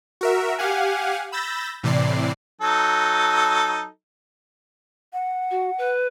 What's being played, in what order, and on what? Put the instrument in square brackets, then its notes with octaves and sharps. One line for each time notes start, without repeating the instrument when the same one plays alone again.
[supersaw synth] F#4 A#4 E5
G4 F5 F#5 G#5
B5 E6 G6 A6 A#6
A2 C3 E3 D5 C7
[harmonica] F#3 D#4 A4
[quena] F#5
[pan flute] F#4
B4